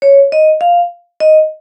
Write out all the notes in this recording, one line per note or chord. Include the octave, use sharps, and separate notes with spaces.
C#5
D#5
F5
D#5